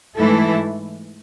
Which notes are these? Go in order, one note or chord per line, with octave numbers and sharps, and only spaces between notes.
G#2 E3 A3 E4 A4